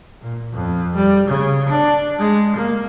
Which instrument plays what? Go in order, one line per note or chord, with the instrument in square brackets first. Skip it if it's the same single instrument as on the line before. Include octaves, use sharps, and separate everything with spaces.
[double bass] A#2
F2
G3
C#3
D4
G#3
A#3